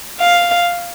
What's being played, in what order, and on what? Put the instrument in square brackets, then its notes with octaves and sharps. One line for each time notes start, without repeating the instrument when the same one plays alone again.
[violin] F5